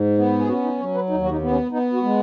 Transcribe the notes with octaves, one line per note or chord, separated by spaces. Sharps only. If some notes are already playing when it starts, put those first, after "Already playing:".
Already playing: G#2
B3
G#4
C#4 F#4
D#4
F#3 C#5
B4
D#2 D#4
F#4
D#4
B3
C#4
B3 D#4
F#4
G#3